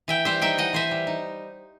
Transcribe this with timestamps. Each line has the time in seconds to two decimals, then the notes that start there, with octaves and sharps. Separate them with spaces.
0.08 E3 E5 G5
0.25 G3 C5 E5
0.42 D#4 E5 G5
0.58 E3 D#5 F#5
0.73 E3 C5 E5
0.91 G3
1.07 D#4